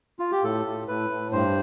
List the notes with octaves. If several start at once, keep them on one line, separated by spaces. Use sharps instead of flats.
F4
G4
A2 A4
A2
A2 B4
A2
G2 C5